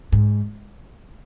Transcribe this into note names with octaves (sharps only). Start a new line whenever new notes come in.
G#2